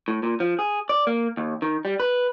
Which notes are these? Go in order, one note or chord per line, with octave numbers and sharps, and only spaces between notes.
A2
A#2
F3
G#4
D5
A#3
D#2
D#3
G3
B4